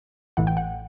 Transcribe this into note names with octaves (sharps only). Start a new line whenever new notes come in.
A1 A2 E3 F#5
G5
F#5